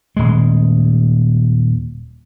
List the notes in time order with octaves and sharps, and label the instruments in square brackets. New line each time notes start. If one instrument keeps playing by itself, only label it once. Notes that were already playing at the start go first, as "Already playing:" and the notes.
[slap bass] D#1 G#3